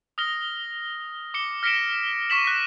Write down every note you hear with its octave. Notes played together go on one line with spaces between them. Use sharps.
D#6 F6 A#6 G7
D6 C#7 G7
F6 A#6 B6 C#7 D7 E7
C#6 D6 A#6 B6 E7 F#7
F#6 A#6 B6